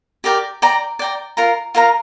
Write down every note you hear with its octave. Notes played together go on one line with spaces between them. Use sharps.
G4 A#4 D5 G5
D5 G5 A#5
D5 G5 A#5
F4 A#4 F5 A#5
F4 A#4 F5 A#5